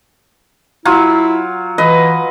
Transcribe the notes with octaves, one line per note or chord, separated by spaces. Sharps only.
F#3 E4 F4
E3 B4 D#5